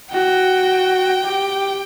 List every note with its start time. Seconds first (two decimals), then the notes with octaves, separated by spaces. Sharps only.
0.12 F#4 G5
1.24 G4